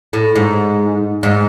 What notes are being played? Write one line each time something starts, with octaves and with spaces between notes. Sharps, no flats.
A2
G#2
G#2